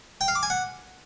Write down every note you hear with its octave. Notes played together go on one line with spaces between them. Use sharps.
G5
F5
D6
G#5
F#5